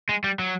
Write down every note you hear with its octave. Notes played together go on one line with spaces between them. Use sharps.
G#3
G3
F#3